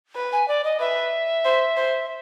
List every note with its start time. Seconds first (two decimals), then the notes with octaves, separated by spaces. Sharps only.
0.15 B4
0.33 G#5
0.48 D5
0.64 D#5
0.80 B4 E5
1.45 C5
1.77 C5